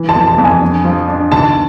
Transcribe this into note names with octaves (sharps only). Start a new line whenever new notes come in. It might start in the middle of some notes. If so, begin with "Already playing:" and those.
Already playing: E3
A5
F2
A5
F2
G#5
D4
F3
D4
D#3 A5